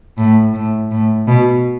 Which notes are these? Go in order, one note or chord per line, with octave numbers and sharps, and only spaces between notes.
A2
A2
A2
B2